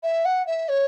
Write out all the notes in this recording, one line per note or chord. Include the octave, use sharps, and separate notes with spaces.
E5
F#5
E5
C#5